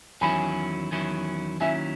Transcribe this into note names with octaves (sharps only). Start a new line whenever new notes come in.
E2 D#3 F#3 C#4 E4 G#5 B5
E2 D#3 F#3 C#4 E4
D#2 D#3 F#3 C#4 E4 E5 G#5